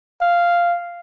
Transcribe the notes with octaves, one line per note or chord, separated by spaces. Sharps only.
F5